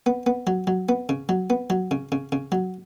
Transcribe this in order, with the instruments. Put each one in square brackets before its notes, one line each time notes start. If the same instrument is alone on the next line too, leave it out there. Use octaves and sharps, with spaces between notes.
[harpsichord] B3
B3
F#3
F#3
B3
C#3
F#3
B3
F#3
C#3
C#3
C#3
F#3